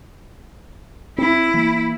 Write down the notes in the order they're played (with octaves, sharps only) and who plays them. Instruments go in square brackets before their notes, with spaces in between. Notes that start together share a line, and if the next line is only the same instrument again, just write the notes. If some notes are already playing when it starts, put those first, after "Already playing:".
[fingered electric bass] C4 [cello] E4
[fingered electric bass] E3 A#3